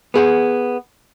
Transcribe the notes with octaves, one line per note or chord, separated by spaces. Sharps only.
B3 G#4 F#5